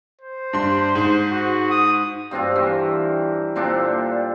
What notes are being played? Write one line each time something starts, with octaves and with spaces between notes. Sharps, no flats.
C5
G2 C6
G#2
F#4
D#6
G2 C4 D4 F4
E3 C4 A#4
A#2 C4 D4 A4